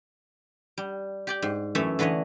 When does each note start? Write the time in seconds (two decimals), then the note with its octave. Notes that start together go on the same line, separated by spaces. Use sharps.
0.78 G3
1.27 G4 D5 G5
1.42 G#2
1.75 F#2 E3 A3 A4 C#5 E5
1.99 D3 E3 B4 C#5 D#5